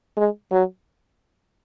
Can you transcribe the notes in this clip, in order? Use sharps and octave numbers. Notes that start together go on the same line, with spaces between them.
G#3
F#3